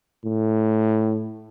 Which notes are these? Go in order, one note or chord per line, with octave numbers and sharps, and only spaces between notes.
A2